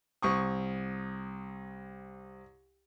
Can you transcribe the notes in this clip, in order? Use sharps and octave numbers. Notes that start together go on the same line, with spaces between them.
C2 C#6 D#6